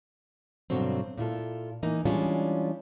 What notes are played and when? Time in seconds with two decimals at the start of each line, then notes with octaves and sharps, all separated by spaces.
0.70 G2 B2 D3 F#3 C4
1.18 A#2 E4 F4 A4
1.83 E3 A#3 D#4
2.05 E3 G3 G#3 C#4 D4 F4